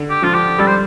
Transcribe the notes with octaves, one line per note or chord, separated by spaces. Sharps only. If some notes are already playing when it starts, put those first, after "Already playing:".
Already playing: D3
G4
F3 F4
G4
G3 A4
C5